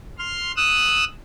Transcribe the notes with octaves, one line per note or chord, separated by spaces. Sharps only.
C6 F6
D#6 E6 F#6